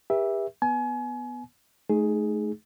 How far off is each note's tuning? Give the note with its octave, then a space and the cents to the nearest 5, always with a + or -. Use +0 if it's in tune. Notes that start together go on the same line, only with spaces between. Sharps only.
G4 +35 B4 -40 E5 +0
B3 +0 G#5 +35
A3 -30 D#4 +0 G#4 +5